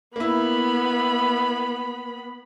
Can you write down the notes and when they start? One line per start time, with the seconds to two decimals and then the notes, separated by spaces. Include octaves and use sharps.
0.16 A#3 B3 E4 B5